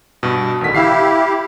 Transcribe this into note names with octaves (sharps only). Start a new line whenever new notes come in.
G2 B2
A1 D3 D#3 B6
E4 G4 E5 F5 C7